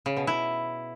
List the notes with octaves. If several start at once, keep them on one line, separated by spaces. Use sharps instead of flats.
C#3
B2
E4